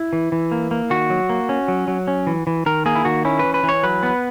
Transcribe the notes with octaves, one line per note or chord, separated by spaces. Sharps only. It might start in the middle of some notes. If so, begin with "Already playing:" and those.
Already playing: E4
E3
E3
A#3
A#3
D#3 F#4
F#3
A#3
C#4
F#3
F#3
C#4
E3
E3
D#3 A#4
A#3 G#4
E4
D#3 F#4
C#4 E4
E3 B4
B4
E3
C#5
F#3 B4
B3